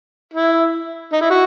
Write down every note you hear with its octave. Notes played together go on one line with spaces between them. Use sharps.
E4
D#4
E4
F#4